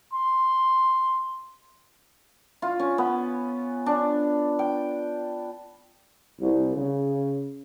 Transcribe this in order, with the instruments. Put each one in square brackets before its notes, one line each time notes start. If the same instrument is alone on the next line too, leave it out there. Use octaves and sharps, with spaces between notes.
[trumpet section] C6
[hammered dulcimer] F4
C#4
B3
D4
G5
[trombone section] C2
C#3